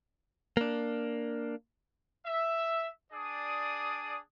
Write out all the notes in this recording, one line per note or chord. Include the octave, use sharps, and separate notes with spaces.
A#3 D4
E5
D4 G#4 D5 D#6